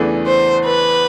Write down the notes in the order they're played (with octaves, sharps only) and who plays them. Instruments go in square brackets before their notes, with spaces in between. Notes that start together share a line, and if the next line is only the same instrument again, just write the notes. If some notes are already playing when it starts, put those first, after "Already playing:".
Already playing: [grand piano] E2 C#3 E3 A3 D4
[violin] C5
B4